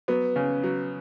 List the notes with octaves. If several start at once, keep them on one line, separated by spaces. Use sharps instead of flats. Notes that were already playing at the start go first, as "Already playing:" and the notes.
F#3 B3
C#3
F#3